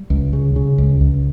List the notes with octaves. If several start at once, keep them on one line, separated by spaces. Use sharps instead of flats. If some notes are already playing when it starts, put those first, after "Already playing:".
Already playing: G3
C#2
C#3
C#3
C#2
C#2